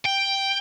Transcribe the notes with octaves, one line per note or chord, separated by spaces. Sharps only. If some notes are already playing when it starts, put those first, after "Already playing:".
G5